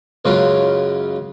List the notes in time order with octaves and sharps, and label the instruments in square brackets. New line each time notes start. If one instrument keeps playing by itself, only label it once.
[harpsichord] C#2 F#2 C#3 F#3 F4